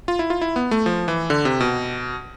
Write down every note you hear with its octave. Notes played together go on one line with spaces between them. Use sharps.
F4
E4
F4
E4
B3
A3
F3
E3
D3
C3
B2